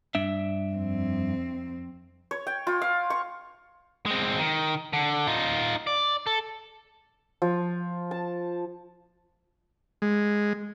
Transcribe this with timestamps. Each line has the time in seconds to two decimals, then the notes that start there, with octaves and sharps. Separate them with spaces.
0.15 G2 D4 E5
0.73 F2 C4
2.31 C#5
2.47 G5
2.67 F4
2.82 F5
3.10 C#6
4.06 G#3 C4
4.39 D#3
4.93 D3
5.27 D#4 F4
5.87 D5
6.27 A4
7.42 F3
8.11 A5
10.02 G#3